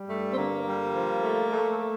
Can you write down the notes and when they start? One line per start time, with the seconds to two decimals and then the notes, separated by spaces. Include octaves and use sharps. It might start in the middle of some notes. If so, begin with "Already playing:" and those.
Already playing: G3
0.08 G2 A3
0.32 C4
0.37 D3 A#3
0.65 G3
0.93 F3
1.22 A3
1.50 A3
1.78 A3